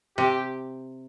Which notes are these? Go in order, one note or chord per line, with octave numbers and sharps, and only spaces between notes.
C3 G4